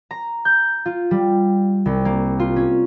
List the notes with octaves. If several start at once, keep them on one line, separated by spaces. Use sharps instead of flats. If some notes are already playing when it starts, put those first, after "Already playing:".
A#5
G6
F4
G3
C2
A#3
F4
C#4